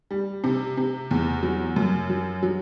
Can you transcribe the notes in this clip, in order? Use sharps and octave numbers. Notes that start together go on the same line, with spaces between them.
G3
C3
C3
E2
F#3
F#2
F#3
F#3